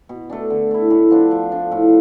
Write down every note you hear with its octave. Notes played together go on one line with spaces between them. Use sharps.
B2
A3 D4
D3
A3 E4
A2
F3 B3 D4
F3
A3 D4
A2